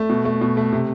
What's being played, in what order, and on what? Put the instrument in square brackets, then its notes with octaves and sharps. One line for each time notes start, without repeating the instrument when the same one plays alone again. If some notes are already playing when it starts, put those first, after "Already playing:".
Already playing: [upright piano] A3
B2
A3
B2
A3
C3